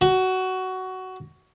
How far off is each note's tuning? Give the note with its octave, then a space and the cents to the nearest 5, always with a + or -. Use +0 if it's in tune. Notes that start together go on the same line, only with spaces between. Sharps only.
F#4 +15